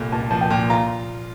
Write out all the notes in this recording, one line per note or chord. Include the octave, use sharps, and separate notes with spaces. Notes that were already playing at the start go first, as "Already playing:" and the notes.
Already playing: C2 A#2 A3
A#2 A5
F3 A5
G5
A#2
F4 A#5